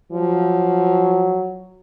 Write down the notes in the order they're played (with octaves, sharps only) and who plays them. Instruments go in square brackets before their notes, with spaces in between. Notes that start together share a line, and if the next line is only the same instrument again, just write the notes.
[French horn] F3 [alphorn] F#3